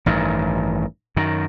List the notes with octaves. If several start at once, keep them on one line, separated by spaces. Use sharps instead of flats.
A1 G2 D#3
F#2 D#3